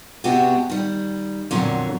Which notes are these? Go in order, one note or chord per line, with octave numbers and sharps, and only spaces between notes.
C3 G#3 B3 D4 F#4 G4
D#3 G3
F2 A#2 D3 F#3 C#5